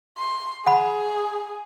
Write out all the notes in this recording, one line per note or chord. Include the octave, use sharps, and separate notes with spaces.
C6
G#4 F#5 B5